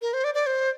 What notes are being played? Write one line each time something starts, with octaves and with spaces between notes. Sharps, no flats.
A#4
C5
D5
D5
C5